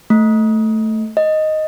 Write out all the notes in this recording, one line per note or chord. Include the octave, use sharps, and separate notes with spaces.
A3
D#5